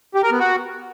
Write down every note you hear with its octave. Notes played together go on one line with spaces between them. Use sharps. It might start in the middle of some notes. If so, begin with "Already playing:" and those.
G4
A#4
B3
F#4